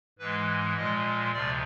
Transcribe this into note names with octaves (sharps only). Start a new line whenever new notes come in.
G#2 E3 G#3 B4
A#2 F3 G#3 D#5
D2 C3 F3 D5